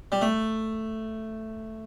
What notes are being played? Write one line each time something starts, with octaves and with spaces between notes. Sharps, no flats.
G3
A3